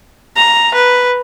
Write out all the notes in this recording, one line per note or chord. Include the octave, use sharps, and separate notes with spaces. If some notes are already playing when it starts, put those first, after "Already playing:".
A#5
B4